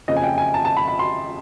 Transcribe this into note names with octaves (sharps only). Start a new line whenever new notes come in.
F#1 F2 C#3 F3 D#5
G#5
G5
G#5
A5
A5
B5
B5
C6